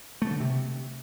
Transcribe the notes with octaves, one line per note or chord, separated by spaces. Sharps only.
A3
D3
C3